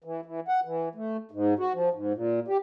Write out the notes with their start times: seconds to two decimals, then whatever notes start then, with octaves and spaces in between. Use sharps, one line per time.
0.04 E3
0.25 E3
0.48 F#5
0.65 E3
0.95 A3
1.31 G#2
1.59 F#4
1.74 F3
1.93 G#2
2.14 A#2
2.48 G4